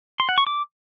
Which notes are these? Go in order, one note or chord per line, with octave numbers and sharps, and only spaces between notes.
C6
F#5
C#6
D6